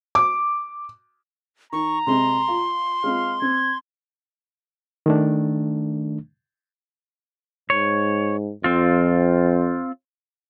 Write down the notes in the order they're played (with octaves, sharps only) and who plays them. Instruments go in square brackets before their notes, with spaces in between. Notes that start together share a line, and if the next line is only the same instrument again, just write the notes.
[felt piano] D6
[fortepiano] D#3 [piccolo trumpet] A#5 [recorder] C#6
[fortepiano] C3 G#3 C4 [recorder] C6
[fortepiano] F4
[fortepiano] G#3 C4 F4 [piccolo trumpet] F5
[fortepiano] C4 [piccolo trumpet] G#6
[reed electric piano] D#3 A3 D4
[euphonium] G#2 [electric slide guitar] C#5
[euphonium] F2 [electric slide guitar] C4 F4